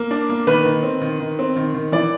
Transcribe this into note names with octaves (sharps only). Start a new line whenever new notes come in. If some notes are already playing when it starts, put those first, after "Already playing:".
Already playing: A#3
D4
A#3
D#3 B4
D#3
C4
D#3
D#3
C4
D#3
D#3
E3 D5